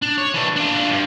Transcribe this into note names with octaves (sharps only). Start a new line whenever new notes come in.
D4
C#5
E3 D4
D4 F4
G2